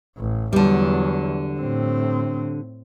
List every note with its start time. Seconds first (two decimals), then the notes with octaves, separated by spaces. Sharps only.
0.17 A1
0.53 E2 D3 F#3 G3
1.60 A2 C4